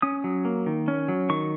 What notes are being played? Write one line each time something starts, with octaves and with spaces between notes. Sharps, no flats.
C#4 D#6
F#3
A#3
D#3
C#4
F#3
D#3 C#6